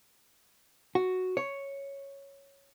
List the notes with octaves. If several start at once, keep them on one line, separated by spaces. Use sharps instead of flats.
F#4
C#5